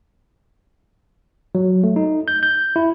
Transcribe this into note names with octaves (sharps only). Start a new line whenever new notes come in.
F#3
A3
D#4
G6
G6
E4